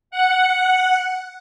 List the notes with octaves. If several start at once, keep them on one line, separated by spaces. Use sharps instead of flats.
F#5